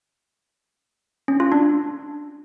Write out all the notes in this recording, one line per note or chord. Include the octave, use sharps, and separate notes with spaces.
C#4
F4
D4